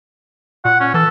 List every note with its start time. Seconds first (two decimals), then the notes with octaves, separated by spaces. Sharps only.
0.65 A#2 F#5
0.80 C#4
0.94 E3 A4